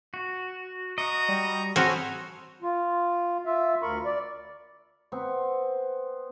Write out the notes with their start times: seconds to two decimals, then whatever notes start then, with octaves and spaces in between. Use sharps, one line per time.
0.14 F#4
0.98 F#4 D#5 A#5 C#6 D#6
1.28 G3
1.76 C4 F#4 A4 C#5 G#5 B5 D#6 F6
2.63 F4
3.46 F4 E5
3.82 D2 A#4 B5 C#6
4.05 D5
5.12 B3 C4 C#6